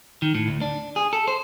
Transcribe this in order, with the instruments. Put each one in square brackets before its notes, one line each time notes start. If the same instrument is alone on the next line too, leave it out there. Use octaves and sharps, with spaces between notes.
[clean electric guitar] D#3
A2
D2
D4
G#4
A4
C5